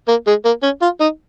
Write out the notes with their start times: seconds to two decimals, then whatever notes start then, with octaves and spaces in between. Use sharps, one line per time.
0.08 A#3
0.27 G#3
0.45 A#3
0.63 C#4
0.82 F4
1.01 D#4